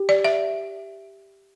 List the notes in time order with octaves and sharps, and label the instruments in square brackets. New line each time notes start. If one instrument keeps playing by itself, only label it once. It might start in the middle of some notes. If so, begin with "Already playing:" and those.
Already playing: [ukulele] G4
[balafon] D5
E5